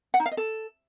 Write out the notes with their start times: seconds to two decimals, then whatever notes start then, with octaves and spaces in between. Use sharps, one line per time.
0.14 F#5
0.20 D#4
0.26 F5
0.31 D#5
0.37 A4